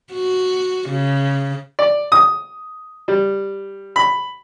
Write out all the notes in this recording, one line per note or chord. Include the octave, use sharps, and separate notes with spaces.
F#4
C#3
D5
D#6
G3
B5